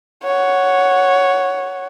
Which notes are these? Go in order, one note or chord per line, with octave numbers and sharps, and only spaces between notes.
C#5 F#5